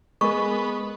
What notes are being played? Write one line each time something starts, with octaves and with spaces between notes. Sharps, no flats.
G#3 B3 A#4 C#6